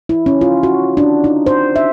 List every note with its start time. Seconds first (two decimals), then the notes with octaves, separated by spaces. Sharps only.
0.09 E4
0.26 C#4
0.41 F4
0.63 F#4
0.97 D4
1.24 D#4
1.46 C5
1.76 E5